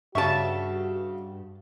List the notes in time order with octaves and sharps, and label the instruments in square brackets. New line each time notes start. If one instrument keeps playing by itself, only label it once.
[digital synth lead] G2 [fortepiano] C#3 C#6 [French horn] F#4 [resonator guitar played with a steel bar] E5 A5